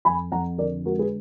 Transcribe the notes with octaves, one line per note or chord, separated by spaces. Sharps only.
F2 G#5 B5
F2 F#5 A#5
D3 A#4 D5
G#3 F#4 A#4
G#4 B4